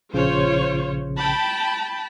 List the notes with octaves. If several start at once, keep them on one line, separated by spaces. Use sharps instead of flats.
A#1 C#3 F4 C5 C#5
G5 A5 B5